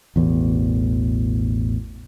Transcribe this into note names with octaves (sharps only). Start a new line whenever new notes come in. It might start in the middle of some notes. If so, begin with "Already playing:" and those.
A1 E2 B2